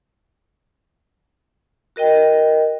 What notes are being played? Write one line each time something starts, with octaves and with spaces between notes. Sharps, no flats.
F#4 A#4 D#5 G5